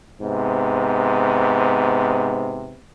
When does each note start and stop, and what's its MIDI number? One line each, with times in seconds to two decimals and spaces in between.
0.21 2.81 44
0.21 2.81 48
0.21 2.81 59